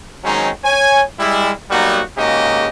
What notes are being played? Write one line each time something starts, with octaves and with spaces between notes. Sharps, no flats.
D#3 F#3 G#3 C4 C#4 D#4
C#5 G#5
G3 G#3 E4
F#3 G3 A#3 B3 D#4 F#4
G#2 C#3 A#3 F#4 G4 D#5